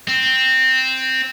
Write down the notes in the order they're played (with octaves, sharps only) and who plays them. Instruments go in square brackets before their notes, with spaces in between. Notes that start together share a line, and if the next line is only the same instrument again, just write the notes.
[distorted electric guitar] C4